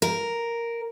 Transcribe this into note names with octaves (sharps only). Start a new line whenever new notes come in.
A#4